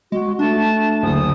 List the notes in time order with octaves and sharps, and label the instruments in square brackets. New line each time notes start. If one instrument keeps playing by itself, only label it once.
[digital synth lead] G#3 [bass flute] F#4
[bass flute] A3 [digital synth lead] D4 [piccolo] A5
[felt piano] F#1 D2 [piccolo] D#6